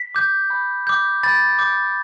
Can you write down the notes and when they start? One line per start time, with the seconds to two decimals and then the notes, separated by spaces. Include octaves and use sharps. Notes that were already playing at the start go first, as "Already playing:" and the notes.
Already playing: B6
0.15 D6 G6
0.50 B5
0.87 D6 G6
1.23 B5 A6
1.59 D6 G6